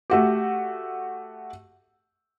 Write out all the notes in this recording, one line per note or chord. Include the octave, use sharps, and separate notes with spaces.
A3 F#4 G4